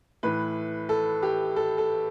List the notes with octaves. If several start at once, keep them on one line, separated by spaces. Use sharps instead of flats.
A2 E3 B4
A4
G4
A4
A4